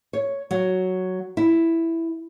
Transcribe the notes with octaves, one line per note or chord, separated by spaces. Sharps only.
C#5
F#3
E4